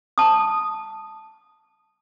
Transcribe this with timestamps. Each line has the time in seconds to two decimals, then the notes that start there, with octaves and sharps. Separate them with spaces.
0.18 A5 D#6